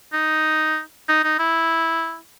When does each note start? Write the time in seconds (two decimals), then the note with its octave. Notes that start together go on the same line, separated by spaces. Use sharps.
0.13 D#4
1.09 D#4
1.24 D#4
1.39 E4